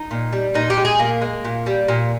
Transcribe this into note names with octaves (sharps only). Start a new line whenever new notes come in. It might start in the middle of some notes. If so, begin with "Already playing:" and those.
Already playing: D#4
A#2
G3
A#2 D#4
G4
G#3
G#4
A#2 A#3
G#3
A#2
G3
A#2